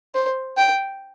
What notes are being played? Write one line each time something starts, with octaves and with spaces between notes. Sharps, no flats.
C5
G5